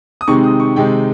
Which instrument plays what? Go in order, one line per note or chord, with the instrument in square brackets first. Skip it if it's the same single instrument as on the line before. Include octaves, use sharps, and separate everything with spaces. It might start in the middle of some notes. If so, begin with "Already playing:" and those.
[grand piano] D#6
C3 D#3 G#3 C4 D#4 C#6
D#6
C#6
C3 D#3 G#3 C4 D#4 G5